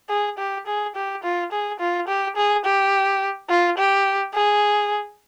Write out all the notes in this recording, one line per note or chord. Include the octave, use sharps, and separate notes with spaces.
G#4
G4
G#4
G4
F4
G#4
F4
G4
G#4
G4
F4
G4
G#4